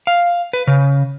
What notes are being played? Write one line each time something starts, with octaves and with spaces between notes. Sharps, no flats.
F5
B4
C#3